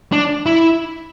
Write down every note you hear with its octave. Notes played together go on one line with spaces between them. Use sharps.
D4
E4